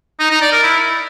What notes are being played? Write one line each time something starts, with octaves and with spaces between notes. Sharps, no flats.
D#4
D#4
D5
A#4
E4